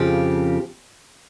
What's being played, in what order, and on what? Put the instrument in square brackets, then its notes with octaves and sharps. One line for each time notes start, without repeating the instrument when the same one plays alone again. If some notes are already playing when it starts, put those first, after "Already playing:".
Already playing: [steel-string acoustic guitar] F2 C#3 F3 G4